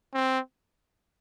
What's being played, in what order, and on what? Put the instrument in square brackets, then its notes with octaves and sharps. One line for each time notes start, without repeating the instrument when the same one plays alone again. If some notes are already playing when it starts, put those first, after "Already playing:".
[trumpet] C4